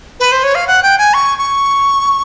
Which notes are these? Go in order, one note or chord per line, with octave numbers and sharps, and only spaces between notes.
B4
C5
C#5
F5
F#5
G5
G#5
C#6
C#6